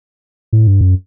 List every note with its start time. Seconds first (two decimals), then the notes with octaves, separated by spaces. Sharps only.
0.53 A2
0.67 G2
0.81 F#2